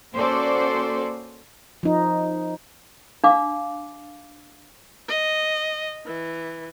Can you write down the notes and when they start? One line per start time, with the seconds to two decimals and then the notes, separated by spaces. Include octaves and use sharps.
0.13 A#3 C#4 F#4 A4 C5 D5
1.83 F3 D#4
3.24 D4 F5 D6
5.09 D#5
6.06 E3